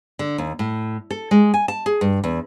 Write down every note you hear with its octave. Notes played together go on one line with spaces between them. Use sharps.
D3
D#2
A2
A4
G#3
G#5
A5
G#4
G2
E2